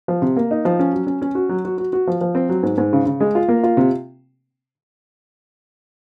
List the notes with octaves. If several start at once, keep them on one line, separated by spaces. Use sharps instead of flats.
F3
C3
A#3
D#4
F3
C#4
F#3
C#4
C#4
F#4
F#3
F#4
F#4
F#4
F3
F3
C4
F#3
G#2
G#2
C#3
C#3
G#3
F4
A#3
F4
C3